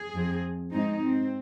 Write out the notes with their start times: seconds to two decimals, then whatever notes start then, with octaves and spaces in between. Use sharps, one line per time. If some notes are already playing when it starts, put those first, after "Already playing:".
Already playing: G#4
0.13 F2 F3 C4
0.71 G#2 G#3 C4 D#4
1.01 C4